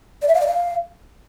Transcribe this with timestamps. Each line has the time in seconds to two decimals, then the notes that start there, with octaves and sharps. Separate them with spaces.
0.22 D5
0.28 E5
0.34 F5
0.41 D5
0.47 F5